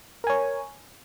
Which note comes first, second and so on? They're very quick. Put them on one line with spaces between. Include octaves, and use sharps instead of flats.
A#4 G#5 C#5